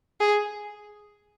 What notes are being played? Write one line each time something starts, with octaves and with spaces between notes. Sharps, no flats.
G#4